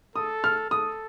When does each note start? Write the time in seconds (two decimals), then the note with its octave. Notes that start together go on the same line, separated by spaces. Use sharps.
0.16 A4 D#6
0.44 F6
0.70 A4 D#6